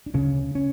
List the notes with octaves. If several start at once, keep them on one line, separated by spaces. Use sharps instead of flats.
D4
D2 C#3 C#4
C#4